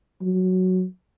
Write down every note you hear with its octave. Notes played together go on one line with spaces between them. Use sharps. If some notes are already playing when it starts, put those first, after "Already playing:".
F#3